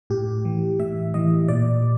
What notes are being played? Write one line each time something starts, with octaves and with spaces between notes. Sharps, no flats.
A2 G4
E3
A2 E5
E3 D#5
A#2 D5